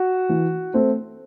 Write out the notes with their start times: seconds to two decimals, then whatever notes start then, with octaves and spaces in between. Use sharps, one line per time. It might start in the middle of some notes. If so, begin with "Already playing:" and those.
Already playing: F#4
0.29 E3
0.73 A3 C4